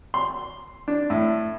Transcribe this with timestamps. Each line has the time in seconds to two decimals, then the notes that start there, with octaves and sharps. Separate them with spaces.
0.14 C6
0.88 D4
1.10 A2